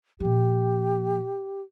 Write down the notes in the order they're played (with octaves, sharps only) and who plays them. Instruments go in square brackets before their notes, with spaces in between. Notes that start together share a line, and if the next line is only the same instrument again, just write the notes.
[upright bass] A#2 F3 [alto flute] G4